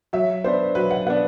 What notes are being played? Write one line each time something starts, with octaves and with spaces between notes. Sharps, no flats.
F#3 E5
B3 D4 C5
F#3 B4
F#5
B3 D4 F#5